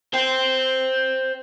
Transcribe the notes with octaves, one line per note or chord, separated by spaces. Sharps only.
C5 G5